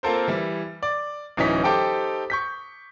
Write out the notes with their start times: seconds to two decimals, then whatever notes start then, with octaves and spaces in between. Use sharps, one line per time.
0.03 A#3 C4 F4 A4 A#4 C5
0.28 E3 G3 E4
0.83 D5
1.37 D1 E3 C#4 D#4 B6
1.64 D#4 G4 A4 C5 G5 D6
2.30 C#6 G6 B6